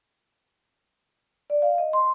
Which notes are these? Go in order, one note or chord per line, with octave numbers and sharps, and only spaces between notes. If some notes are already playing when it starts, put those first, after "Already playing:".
D5
F5
D#5
C6